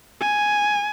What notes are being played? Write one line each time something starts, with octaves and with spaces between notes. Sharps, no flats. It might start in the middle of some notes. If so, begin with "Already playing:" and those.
G#5